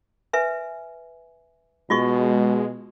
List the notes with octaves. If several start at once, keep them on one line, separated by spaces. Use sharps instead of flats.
B4 E5 G#5
B2 G#3 F4 D#5 C#6